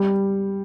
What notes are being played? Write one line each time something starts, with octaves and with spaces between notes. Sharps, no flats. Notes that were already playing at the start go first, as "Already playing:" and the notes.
Already playing: G3